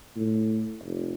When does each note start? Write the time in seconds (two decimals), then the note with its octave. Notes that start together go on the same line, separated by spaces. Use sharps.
0.16 A2
0.83 F1